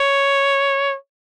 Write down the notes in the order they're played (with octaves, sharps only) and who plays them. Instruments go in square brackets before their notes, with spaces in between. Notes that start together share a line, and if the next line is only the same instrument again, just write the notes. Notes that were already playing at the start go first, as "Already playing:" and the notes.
Already playing: [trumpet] C#5